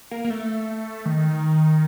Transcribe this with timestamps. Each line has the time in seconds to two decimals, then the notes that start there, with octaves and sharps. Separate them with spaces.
0.11 A#3
0.24 A#3
0.30 A3
1.05 D#3